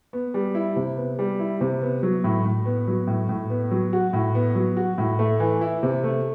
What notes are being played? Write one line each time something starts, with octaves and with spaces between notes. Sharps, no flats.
B3
G3
E4
C3
B3
G3
E4
C3
B3
F#3
A2
A2
B3
F#3
A2
A2
B3
F#3
F#4
A2
B3
F#3
F#4
A2
A3
E3
E4
C3
A3